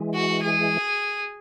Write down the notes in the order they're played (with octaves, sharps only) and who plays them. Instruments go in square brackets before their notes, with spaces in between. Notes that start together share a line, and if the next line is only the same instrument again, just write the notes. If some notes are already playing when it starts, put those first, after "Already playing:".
Already playing: [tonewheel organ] E3 G#3
[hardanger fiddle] F#4
G#4